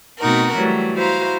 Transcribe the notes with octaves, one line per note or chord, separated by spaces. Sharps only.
B2 A3 C4 D#4 F#4 A#4
E3 F#3 G3 A3
E4 F#4 C5 F5 A#5